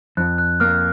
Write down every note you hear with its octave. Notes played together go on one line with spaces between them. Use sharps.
F2 F#6
F#6
A#3 F6